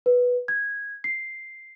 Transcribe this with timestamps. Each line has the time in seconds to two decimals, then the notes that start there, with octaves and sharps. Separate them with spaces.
0.06 B4
0.48 G#6
1.04 C7